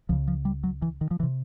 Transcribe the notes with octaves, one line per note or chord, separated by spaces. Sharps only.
C#2 C#3 F3
F3
G3
F#3
E3
D#3
F3
E3
C3